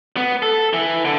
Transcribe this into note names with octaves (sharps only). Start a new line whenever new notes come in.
B3
A4
E3
D3